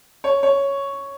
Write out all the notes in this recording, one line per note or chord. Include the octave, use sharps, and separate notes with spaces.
C#5
C#5